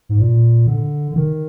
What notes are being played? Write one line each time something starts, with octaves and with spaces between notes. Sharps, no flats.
G#2
A#2
D3
D3
D#3